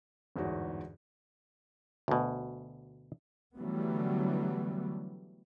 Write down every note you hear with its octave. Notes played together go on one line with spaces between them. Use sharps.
G1 E2 G#2 F#4 C#5
D2 B2
D3 E3 F#3 G3 A3 B3